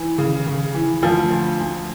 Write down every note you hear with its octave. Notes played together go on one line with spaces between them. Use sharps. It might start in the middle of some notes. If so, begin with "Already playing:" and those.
Already playing: E3
C#3
C#3
E3
D2 F3
D2
D2